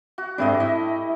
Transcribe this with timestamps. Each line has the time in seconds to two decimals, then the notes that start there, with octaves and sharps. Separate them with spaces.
0.18 F#4
0.38 G#2 G3 A3 C4 D4 D#5
0.60 E4 D#5